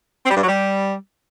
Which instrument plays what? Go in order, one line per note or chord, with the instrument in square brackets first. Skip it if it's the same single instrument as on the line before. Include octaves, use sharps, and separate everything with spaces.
[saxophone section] C4
G3
G2
F#3
G3